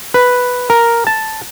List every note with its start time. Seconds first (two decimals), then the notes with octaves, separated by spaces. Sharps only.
0.14 B4
0.70 A#4
1.07 A5